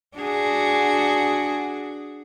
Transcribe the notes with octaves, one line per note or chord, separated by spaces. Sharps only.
D4 F#4 G#4